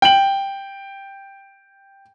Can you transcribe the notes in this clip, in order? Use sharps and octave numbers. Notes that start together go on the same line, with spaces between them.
G5 F#7